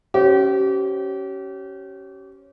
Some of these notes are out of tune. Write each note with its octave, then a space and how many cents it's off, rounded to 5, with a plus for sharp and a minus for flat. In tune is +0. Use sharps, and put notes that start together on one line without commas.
C#4 +0 G4 -35 C5 +0